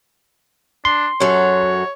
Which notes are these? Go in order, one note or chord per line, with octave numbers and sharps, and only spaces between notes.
D4 C6
F#2 F#3 A4 C#5